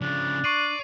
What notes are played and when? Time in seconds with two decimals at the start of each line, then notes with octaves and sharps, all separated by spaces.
0.02 C#3 F3 D4
0.44 D5 C#6 C7 D#7